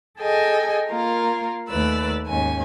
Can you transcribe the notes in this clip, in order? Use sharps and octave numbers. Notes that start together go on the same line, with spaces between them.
G#4 A4 D#5 G5 G#5
A#3 F4 A#4
D#2 A3 B4 D5 E6
D#2 G#2 C#4 G#5